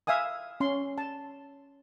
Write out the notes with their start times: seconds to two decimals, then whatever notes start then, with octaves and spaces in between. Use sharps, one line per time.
0.07 E5 F5 G#5 D#6
0.60 C#4 C6
0.98 A5